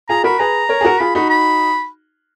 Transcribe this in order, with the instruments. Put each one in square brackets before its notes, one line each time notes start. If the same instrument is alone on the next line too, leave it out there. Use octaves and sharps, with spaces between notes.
[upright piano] F4 G#4 [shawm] A#5
[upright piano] F#4 A#4 [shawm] B5
[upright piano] G#4 B4 [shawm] A#5
[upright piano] A#4 C#5
G#4
F#4 A#4
[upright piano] F4 G#4 [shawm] B5
[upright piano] D#4 F#4 [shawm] B5
[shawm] B5